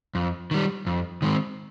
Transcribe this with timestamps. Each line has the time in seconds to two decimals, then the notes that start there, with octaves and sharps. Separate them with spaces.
0.15 F2
0.51 D#3 G3
0.87 F2
1.22 D#3 G#3 C4